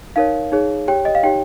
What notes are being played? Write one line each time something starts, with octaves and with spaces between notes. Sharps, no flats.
D#4 A#4 C#5 F5
D#4 G#4 C#5
G4 C#5 G5
D#5
F5
D#4 G4 C#5 G5